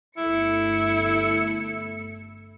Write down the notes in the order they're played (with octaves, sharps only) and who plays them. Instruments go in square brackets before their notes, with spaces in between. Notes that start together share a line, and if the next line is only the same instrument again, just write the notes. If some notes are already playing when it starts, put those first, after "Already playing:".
[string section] G1 A3 C#7 [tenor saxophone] E4